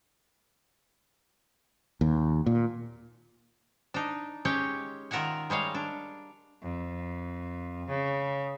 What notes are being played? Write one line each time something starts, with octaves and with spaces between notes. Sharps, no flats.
D#2
A#2
D4 D#4
G#3 C#4 G4 C#5 G5
D#3 F4 A#4 E5 F#5 G#5
G3 G#3 C#5 F5
D4
F2
C#3